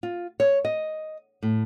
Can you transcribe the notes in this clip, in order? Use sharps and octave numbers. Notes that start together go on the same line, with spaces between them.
F4
C#5
D#5
A2